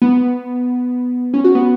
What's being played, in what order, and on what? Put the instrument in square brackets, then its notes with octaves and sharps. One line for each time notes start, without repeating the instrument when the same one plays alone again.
[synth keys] B3
C#4
F#4
B3